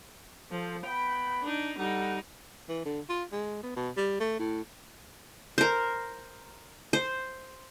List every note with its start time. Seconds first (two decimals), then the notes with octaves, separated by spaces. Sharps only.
0.51 F3 A4 C5
0.85 B3 G5 B5
1.43 D4 D#4
1.78 G3 D#4 A4 F#5
2.69 E3
2.85 D3
3.09 F4
3.32 G#3
3.63 B3
3.76 B2
3.96 G3
4.20 A3
4.39 A2
5.58 A#4 C5
6.93 C5